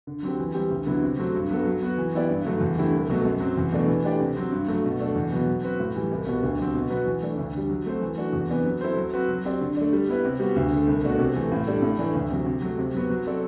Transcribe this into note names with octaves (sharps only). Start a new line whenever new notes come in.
D3
F#3 C4 G4
E3
G3 C4 G4
D2
D3 F#3 B3 E4
C3
F#3 A3 C4 F#4
G2
F#3 B3 F#4 A4
F#3
B3 F#4
E3
B3 E4 G4 D5
G2
D3 F#3 A3
E2
D3 A3 E4 G4
C2
B2 F#3 A3
F#2
F#3 C4
E2
B2 A3 D4
E3
A3 D4 G4 D5
C3
F#3 C4
G2
F#3 A3
B2
A3 D4 A4
E2
B2 F#3 B3
F#3
C4 F#4 B4
A2
E3 G3
C2
B2 G3 B3 F#4
D2
C3 F#3 C4
B2
F#3 B3 F#4 B4
E3
A3 D4
D2
D3 G3
F#3
A3 C4 F#4 C5
E3
A3 D4 F#4
E2
C3 E3 B3 D4
F#3
C4 E4 A4 C5
F#3
C4 F#4 B4
F#3
C4 G4 D5
D3
A3 D4
G3
B3 E4 B4
C3
G3 B3 F#4
D2
D3 A3
C2
B2 A3 D4 F#4
C3
E3 A3
A2
G3 D4 A4
A2
E3 A3 D4
D2
C3 F#3
C3
F#3 A3
C3
F#3 B3 F#4
F#3
C4 F#4 A4 D5